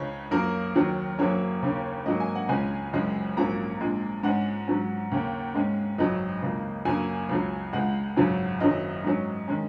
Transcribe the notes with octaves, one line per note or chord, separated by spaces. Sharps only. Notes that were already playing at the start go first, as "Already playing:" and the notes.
Already playing: C#2 C#3 G#3 C#4 C#5
F#2 F#3 A#3 A#4
D#2 D#3 F#3
F#1 F#2 F#3 A#3 C#4 C#5
D#2 C#3 A#3 C#4
G#2 F#3 A#3 D#5
G#5
F#5
C#2 C#3 G#3 C#4 G#5
F#1 F#2 C#3 G#3 C#4
A#1 G#2 F#3 A#3 C#4 A#5
A#1 A#2 G#3
G#2 G#3 C#4 F#5
G#2 F#3 C#4
D#2 C#3 A#3 C#4
G#2 G#3 C#4
G#1 F#2 C#3 F#3 D#5
C#2 C#3 A#3
F#2 C#3 F#3 A#3 G#5
C#2 C#3 F#3
C#2 C#3 G#3 F#5
G#1 F#2 C#3 F#3 C#4
F#1 F#2 D#3 F#3 C#4 D#5
G#2 F#3 C#4
D#3 G#3 C#4